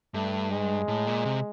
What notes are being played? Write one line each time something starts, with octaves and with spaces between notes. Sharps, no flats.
G2 A3
G#3
A2
A#2
C3